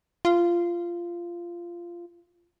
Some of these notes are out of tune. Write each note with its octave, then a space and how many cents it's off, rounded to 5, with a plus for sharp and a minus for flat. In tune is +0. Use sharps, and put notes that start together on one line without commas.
F4 -15